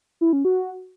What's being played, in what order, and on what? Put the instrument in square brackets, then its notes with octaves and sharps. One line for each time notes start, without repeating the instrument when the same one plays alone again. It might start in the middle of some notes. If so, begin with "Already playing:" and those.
[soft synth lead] E4
C#4
F#4